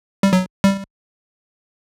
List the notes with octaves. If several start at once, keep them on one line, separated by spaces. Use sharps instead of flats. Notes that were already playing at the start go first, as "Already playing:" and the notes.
G3
F#3
G3